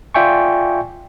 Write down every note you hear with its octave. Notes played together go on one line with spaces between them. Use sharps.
F4 D5 E5 G5 G#5 C#6